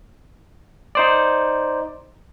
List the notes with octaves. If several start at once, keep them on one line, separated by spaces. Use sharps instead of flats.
D#4 C5 D5